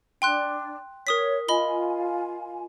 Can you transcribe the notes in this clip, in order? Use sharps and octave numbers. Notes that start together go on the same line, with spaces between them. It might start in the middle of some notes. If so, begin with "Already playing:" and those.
D4 G5 C6 F#6
A#4 C#5 D#6 B6
F4 D#5 G#5 B5 G7